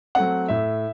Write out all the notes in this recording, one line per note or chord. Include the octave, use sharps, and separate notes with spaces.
F#3 A3 C4 F#5
A2 E5